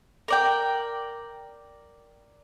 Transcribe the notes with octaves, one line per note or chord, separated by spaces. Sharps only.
A#4 D5 G5